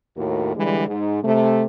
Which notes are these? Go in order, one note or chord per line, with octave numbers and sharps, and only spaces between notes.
D#2 A2 F#4 A#4
D3 E3 G3 G#3
G#2
C3 A3